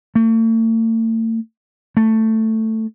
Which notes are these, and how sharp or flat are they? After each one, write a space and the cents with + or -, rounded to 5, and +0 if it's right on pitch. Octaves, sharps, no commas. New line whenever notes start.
A3 +45
A3 +10